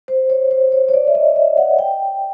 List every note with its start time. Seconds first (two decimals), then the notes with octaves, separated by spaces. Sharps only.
0.08 C5
0.30 C#5
0.51 C5
0.72 C#5
0.88 C#5
0.94 D5
1.07 E5
1.15 D#5
1.36 E5
1.57 F#5
1.79 G5